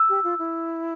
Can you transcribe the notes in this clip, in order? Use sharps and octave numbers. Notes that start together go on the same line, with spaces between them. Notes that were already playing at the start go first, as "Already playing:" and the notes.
Already playing: E6
G4
F4
E4